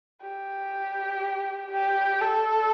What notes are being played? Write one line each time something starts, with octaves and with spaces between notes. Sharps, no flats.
G4
G4
A4